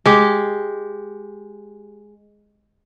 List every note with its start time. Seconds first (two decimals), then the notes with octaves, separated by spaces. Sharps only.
0.06 G#3 G4